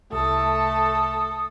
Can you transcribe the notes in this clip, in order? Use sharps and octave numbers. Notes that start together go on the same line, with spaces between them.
C2 A3 A4 D#6